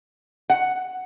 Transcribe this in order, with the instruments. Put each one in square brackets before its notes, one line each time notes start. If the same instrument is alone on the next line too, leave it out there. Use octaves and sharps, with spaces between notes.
[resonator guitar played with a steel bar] F#5